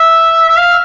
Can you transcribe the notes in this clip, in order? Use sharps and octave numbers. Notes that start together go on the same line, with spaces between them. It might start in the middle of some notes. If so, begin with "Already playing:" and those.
Already playing: E5
E5
F5